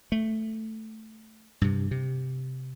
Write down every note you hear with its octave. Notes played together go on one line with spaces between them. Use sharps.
A3
G2 C3
C3